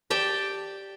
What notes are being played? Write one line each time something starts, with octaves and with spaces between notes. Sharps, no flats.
G4 D5 G5 A5